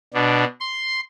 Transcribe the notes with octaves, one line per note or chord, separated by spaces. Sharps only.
B2 D4
C6